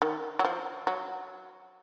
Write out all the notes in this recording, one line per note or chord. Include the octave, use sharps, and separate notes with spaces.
D#3
F#3
F3
F#3